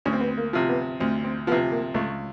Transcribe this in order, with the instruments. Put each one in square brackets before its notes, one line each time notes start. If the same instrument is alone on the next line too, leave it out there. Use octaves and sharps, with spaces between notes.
[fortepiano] D2 [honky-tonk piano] C#4
[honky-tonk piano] C4
B3
C4
A#3
[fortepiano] C3 F3
[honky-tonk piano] B3
[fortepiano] D2 [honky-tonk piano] C4
[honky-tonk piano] C4
[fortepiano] F3 [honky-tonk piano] B3
[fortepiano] C3
[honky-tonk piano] A#3
[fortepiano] C#2 [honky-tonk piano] A3